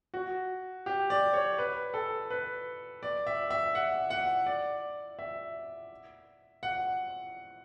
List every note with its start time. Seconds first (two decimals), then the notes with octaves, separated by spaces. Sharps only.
0.14 F#4
0.86 G4
1.10 D5
1.34 C#5
1.58 B4
1.94 A4
2.30 B4
3.03 D5
3.27 E5
3.51 E5
3.75 F#5
4.10 F#5
4.46 D5
5.19 E5
6.63 F#5